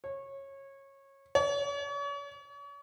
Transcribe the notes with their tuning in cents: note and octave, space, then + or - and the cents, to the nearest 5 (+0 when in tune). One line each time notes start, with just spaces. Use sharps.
C#5 -20
C#5 +40